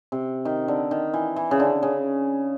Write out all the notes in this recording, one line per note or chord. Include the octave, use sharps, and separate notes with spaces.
C3
D#3
D3
D#3
E3
E3
C#3
D3
C#3